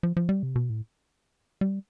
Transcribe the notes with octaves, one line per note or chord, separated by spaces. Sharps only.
F3
F3
G3
C3
B2
A2
G3